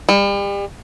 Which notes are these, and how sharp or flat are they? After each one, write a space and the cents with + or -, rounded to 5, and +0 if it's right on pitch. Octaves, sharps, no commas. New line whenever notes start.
G3 +35